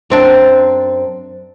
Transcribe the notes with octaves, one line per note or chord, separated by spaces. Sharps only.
F#2 C4 D4